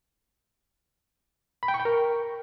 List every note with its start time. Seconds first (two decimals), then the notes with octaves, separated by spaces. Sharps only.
1.63 B5
1.68 G5
1.74 C#6
1.80 G5
1.85 A#4